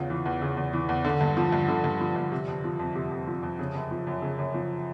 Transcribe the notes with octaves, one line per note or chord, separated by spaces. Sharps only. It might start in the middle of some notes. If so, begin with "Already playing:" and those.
Already playing: E2 C#3 F4
E3
E2
C#3
E2
E3
E2
D3
G2
F3
G2
D3
G2
F3
G2
C3
F2
F3
F2
C3
F2
F3
F2
C#3 G#4
F#2
F3
F#2
C#3
F#2
F3